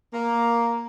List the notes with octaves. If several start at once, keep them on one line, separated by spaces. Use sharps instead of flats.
A#3